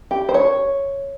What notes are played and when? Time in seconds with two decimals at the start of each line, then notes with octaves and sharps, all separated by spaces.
0.11 G4
0.29 C5
0.34 C#5